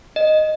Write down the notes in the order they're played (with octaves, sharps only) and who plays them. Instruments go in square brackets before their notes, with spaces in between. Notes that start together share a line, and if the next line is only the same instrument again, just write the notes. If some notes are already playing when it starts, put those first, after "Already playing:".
[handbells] D#5